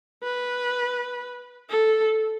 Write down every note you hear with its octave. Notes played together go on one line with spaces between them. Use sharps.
B4
A4